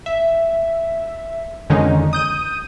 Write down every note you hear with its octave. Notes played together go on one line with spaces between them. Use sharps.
E5
F2 D3 D#3 G#3 C#4 D#4
D#6 G6 D#7